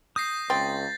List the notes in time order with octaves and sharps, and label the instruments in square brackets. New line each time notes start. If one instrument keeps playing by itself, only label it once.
[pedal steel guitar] D#6 [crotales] G6 A#6 C7
[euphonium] C#2 [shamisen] C4 [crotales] A6